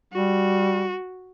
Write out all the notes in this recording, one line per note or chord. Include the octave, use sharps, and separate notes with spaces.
G3 F#4